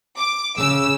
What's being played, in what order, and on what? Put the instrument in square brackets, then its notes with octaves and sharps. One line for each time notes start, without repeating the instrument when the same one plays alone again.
[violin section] D6
[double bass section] C#3 [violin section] E6